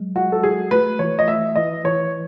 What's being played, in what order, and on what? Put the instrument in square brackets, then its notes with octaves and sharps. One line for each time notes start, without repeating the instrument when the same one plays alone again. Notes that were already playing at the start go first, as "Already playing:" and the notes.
Already playing: [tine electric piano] F#3 G#3
[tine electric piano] G#3 [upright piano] F#4
[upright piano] A4
[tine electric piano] F#4 [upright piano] G#4
[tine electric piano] A3 [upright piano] B4
[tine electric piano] E3 [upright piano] C#5
[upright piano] D#5
[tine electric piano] A3 [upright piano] E5
[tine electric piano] E3 [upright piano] D#5
[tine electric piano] E3 [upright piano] C#5